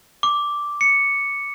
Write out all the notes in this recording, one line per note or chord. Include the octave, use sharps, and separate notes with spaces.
D6
C#7